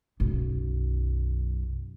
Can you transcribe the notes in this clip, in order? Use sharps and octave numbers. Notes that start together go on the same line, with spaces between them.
B1 F#2